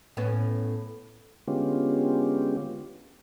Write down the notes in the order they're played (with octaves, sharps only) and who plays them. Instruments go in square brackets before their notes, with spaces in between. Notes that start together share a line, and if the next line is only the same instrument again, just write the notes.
[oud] A2 B3 C#4
[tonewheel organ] D3 G#3 B3 C#4 F4 G4